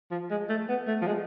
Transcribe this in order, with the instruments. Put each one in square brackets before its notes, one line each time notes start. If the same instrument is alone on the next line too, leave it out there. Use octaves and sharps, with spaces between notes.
[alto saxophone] F3
G#3
A3
B3
A3
F3
G#3